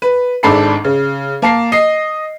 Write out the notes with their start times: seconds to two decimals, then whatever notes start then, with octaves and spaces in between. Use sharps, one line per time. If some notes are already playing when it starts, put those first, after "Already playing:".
0.02 B4
0.43 G#1 G#2 D4 A4 B5 C7
0.84 C#3
1.42 A#3 A5 C7
1.72 D#5 C7